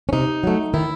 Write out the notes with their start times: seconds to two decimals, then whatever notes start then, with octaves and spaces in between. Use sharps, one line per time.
0.09 C#4
0.13 C3 D#4
0.44 F#3 A3
0.74 D#3 E4